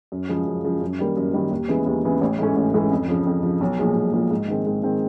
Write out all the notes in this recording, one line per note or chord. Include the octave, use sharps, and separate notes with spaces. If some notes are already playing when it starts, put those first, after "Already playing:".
F#2
C#3 F3 G#3
F#2
C#3 F3 G#3
F#2
D#3 G3 A#3
F#2
D#3 G3 A#3
D#2
C#3 E3 G#3 B3
D#2
C#3 E3 G#3 B3
A1
G#2 E3 A3 C#4
A1
G#2 E3 A3 C#4
F2
C#3 F3
F2
C#3 F3
B1
A#2 F3 G#3
B1
A#2 F3 G#3
G#2
D#3 G#3 C4
G#2
D#3 G#3 C4